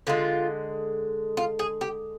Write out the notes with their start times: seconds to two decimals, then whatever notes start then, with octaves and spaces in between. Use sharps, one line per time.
0.07 D3 G#3 F4
1.37 F4
1.59 G#4
1.81 G4